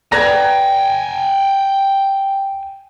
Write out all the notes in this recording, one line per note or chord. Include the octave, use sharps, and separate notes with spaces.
B4 D5 G5 G#5 A#5 G#6 A#6